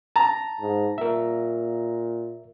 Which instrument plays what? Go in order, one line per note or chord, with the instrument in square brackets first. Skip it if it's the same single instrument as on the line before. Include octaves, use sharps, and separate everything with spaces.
[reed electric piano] A5 [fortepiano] A#5
[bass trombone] G#2
[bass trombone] A#2 [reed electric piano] A#4 E5